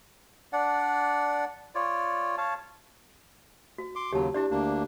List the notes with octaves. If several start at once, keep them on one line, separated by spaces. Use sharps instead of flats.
D4 D5 F#5
F4 C#5 D5
C#5 F5 A5
F#4
C6 D6
D#2 C#3 F#3 G4 A5
D4 E4 G4 D5
D2 A#3 D4